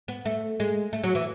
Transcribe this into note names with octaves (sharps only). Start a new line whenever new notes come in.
B3
A3
G#3
A3
F#3
E3